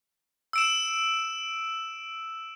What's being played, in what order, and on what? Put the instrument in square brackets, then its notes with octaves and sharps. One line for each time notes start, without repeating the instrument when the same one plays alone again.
[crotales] E6 D7 E7